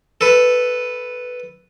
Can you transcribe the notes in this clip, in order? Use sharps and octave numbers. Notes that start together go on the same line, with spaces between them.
A4 B4